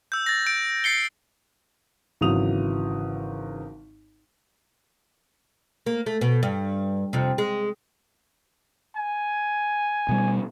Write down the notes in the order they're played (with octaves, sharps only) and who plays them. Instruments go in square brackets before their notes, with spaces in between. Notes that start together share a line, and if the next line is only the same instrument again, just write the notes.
[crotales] E6 G6
A6 A#6
G6 D7
A6 A#6 C7 C#7 G7
[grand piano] G#1 C#3 E3 F#3 D#6 F7
[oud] A#3
A3
B2
G2
F2 C3
G#3
[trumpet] G#5
[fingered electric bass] B2 G3